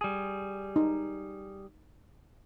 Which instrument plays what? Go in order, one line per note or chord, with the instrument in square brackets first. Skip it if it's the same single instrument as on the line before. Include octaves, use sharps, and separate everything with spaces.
[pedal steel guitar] G3 G#4
[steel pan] D#4